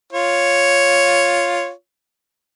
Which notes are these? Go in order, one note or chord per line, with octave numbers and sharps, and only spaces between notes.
F4 C#5